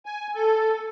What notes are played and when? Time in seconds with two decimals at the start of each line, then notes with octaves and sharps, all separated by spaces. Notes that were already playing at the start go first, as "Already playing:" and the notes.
0.06 G#5
0.35 A4